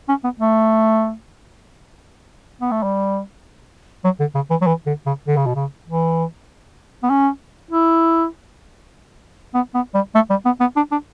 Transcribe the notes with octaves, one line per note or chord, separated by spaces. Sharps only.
C#4
B3
A3
B3
A3
G3
F#3
D3
C#3
E3
F#3
E3
D3
C#3
D3
C#3
B2
C#3
E3
B3
C#4
E4
B3
B3
G3
A3
G3
B3
B3
D4
D4